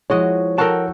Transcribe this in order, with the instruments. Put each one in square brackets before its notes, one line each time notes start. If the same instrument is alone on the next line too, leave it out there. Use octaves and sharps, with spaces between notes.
[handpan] F3 E4 [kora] G#3 F#4 D#5 [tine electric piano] C#5
[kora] F#4 A4 G5 [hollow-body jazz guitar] A#4 A5